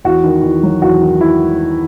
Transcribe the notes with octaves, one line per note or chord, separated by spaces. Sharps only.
E2 F#4
D#3
E2
F#3
E2 F#4
D#3
E4